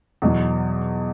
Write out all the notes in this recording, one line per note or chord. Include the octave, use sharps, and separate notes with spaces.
E2 B2 F#3